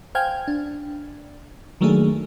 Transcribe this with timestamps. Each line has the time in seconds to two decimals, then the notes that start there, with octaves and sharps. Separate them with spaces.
0.15 C5 F5 G5 G#5 F6 G#6
0.48 D4
1.81 D#3 F#3 A3 A#3 D4 G#4